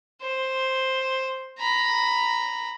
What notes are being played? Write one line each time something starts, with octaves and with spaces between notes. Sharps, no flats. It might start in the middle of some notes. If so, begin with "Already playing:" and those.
C5
A#5 B5